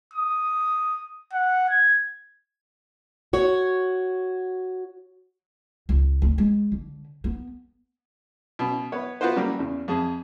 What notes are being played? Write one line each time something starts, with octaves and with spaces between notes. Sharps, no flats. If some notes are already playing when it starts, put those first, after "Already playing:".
D#6
F#5
G#6
F#4 C#5
C#2
D2
G#3
D3
B3
B2 C#4
B3 C#5
B3 F4 F#4 B4 C5
C#3 F#3 G3 A#3
E2 C#3
F2 G#4